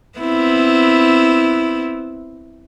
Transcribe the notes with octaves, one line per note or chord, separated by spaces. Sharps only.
B3 C4 E4